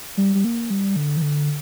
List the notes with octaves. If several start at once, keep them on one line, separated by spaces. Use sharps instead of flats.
G3
G3
A#3
G3
D3
E3
D3